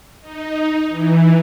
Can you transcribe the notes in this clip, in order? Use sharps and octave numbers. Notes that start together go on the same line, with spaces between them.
D#4
E3